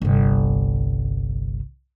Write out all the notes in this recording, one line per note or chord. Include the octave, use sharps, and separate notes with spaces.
G1 C2